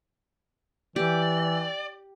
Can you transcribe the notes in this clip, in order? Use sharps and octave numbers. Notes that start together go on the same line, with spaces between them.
E3 G4 D5